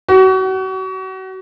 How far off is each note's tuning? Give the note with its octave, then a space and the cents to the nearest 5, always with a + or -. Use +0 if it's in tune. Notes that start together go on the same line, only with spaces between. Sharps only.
F#4 +35